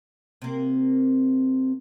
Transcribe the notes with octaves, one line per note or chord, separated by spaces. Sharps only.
C3 A#3